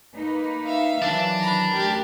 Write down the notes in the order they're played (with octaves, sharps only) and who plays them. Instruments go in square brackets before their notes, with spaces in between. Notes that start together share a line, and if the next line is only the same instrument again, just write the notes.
[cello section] A#3 D#4 B4
[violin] E5 F5
[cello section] D#3 E3 F#3 [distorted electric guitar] D4
[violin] A#5 B5
[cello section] D2 A#4 [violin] G4